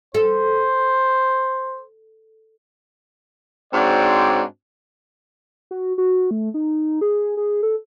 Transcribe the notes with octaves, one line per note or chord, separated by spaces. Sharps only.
A4 C5
G#2 C4 D4 F#4 C#5 D5
F#4
F#4
A3
D#4
G#4
G#4
A4